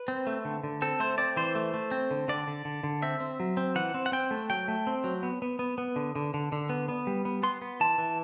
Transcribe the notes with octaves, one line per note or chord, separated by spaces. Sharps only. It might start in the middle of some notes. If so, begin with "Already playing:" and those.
Already playing: B4
C4
A3
D3
D3
C4 A4
A3 C5
C4 D5
E3 C5
A3
A3
C4
D3
D3 D5
D3
D3
D3
C4 E5
C4
F#3
C4
E3 F#5
C4
F#5
C4 G5
A3
F#3 G5
A3
C4
F#3
B3
B3
B3
B3
D3
D3
D3
D3
B3
B3
G3
B3
B3 C6
B3
E3 A5
E3